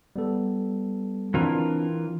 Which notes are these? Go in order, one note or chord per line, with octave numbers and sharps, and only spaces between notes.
G3 B3 A4
E3 C4 D4 F4 A#4